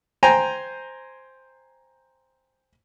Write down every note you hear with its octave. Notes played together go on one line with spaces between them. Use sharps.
C5 G5 G#5 A#5